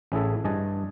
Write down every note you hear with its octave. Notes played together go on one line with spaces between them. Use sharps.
A1 C#4 E4 G#4 A4 E5
G2 D#5 G#5 A5